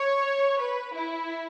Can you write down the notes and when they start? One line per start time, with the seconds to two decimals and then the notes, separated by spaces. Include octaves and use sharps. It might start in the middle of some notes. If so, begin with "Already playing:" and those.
Already playing: C#5
0.60 B4
0.95 E4